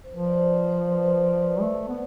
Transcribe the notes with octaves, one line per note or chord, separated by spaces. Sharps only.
C5
F3 B4
D5
C5
D5
C5
B4
B4
D5
B4
A3
B3